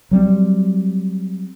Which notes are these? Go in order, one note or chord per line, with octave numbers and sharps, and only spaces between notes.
F#3 G3 C4